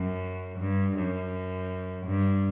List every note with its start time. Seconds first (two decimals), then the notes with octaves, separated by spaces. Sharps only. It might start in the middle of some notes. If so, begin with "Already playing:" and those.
Already playing: F#2
0.59 G2
0.96 F#2
2.06 G2